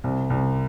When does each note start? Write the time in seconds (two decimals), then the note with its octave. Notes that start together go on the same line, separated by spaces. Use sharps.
0.04 C2
0.30 C2